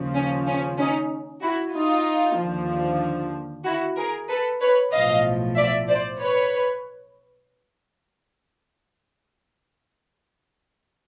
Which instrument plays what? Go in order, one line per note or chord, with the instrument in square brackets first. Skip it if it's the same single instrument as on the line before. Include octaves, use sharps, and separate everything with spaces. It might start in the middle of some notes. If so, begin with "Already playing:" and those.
Already playing: [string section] D#2 C#3 F3
C#4
C#4
C#4 D#4
E4 F#4
D#4 F4
D#2 D3 F3
E4 F#4
G#4 A#4
A4 B4
B4 C#5
B1 A2 F3 D#5 F5
D5 E5
C5 D5
B4 C#5